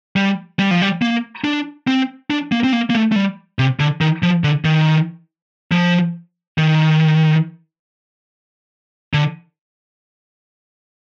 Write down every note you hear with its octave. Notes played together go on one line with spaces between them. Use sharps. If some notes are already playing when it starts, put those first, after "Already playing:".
G3
G3
F3
G3
A#3
D4
C4
D4
A#3
C4
A#3
A#3
A3
A3
G3
C3
D3
D#3
F3
D3
D#3
F3
D#3
D3